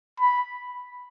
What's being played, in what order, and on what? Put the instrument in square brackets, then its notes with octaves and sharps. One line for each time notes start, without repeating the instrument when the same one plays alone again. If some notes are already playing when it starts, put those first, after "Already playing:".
[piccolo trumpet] B5